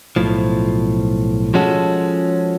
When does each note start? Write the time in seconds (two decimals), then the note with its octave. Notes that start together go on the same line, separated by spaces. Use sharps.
0.16 B1 A2 F3
1.54 F3 G#3 C#4 F#4 A4